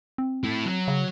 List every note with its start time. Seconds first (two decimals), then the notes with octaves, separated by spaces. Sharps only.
0.18 C4
0.44 A3 E4
0.66 F#3
0.88 C#3